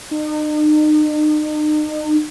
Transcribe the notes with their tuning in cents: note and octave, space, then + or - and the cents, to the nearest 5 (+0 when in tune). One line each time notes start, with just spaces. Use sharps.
D#4 -40